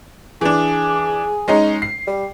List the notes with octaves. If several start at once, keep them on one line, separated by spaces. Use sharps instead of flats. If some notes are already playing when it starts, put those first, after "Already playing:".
E3 D4 G#4
G#3 C#4 D#4
C7
G3